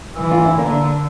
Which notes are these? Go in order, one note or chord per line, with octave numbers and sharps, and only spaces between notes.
E3
D4 F4
C4 E4
D3 A#3 D4